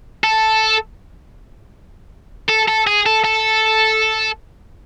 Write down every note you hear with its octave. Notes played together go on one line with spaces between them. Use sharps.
A4
A4
A4
G#4
A4
A4